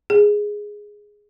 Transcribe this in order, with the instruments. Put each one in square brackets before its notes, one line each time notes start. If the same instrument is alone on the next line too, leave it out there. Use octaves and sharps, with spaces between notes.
[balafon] G#4